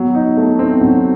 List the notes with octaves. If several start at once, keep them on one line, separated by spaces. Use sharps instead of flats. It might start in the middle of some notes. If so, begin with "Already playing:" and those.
Already playing: F#3 B3
D#4
A3
C4
F#3